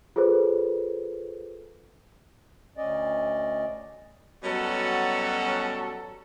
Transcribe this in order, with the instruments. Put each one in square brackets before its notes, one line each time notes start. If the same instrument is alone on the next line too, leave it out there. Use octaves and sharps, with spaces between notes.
[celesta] F4 G#4 A4 B4 C5
[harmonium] D2 C#4 D5 D#5
[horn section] B2 F#3 G3 C#4 F#4 A4